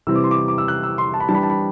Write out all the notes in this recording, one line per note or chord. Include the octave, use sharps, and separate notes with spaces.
C3 E3 G3 C4 E4 E6
D6
C6
D6
D6
E6
F#6
E6
C6
A5
B5
E3 G3 D4 A5
B5
A5
B5